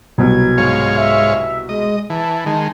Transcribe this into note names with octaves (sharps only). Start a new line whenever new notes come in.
C2 B2 F#3 G#6
G#2 C#5 F5
E5
G#3 D#5
E3 A5
D#3 G#3